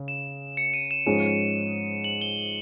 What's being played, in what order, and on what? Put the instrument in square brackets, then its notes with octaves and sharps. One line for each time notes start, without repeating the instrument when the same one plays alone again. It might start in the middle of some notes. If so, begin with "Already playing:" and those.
Already playing: [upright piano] C#3
[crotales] E7
C#7
D#7
E7
[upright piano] G#2 F3 G#3 C#4
[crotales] F#7
G7